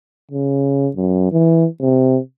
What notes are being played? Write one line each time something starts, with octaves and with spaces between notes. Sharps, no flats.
C#3
F#2
E3
C3